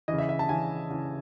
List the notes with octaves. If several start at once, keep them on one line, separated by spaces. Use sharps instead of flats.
C#3 E3 D#5
E5
E5
A5
C#3 E3 G#5
C#3 E3